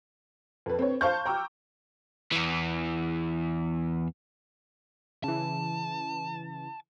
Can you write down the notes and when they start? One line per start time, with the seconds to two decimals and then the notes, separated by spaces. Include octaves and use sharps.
0.66 F2 B4
0.79 C4 B4 C#5
1.01 C5 F5 A5 C#6 F6 G6
1.26 G5 A#5 C#6 D6 E6
2.32 E2 E3
5.24 C#3 E3 A5